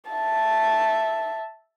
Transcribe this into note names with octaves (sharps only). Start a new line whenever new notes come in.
E5 A5